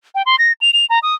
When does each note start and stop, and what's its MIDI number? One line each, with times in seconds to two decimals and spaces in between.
0.15 0.22 79
0.26 0.36 84
0.39 0.52 94
0.61 0.71 101
0.73 0.86 101
0.90 0.99 82
1.03 1.15 87